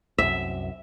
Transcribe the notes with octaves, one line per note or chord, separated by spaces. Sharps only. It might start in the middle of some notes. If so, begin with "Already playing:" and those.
C2 F#2 E5